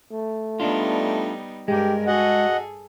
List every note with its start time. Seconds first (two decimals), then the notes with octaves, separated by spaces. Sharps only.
0.12 A3
0.60 G3 B3 D4 D#4 F4
1.68 G2 G#3 G4 A#4
2.07 F#4 G#4 A4 D#5 F#5